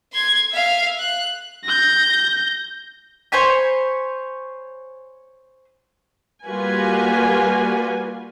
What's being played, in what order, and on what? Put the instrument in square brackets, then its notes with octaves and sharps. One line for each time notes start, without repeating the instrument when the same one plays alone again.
[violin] C6 G#6
E5 F5
F#6
[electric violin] G6 A#6
[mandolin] C5 C#5 G#5 B5
[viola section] G3 A#3 F4 F#4 B4 G#5